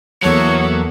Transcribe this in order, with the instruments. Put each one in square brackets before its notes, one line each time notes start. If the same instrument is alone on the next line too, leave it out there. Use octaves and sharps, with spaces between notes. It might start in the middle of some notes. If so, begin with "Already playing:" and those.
[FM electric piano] E2 A4 F#5 [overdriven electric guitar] F#3 [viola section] A#3 B3 E5 [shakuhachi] C#5